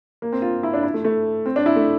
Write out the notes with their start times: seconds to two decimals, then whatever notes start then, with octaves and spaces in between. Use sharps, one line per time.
0.22 A#3
0.32 C4
0.42 F4
0.63 E4
0.74 D4
0.83 E4
0.94 A3
1.05 A3
1.46 C4
1.56 D4
1.66 E4
1.76 A3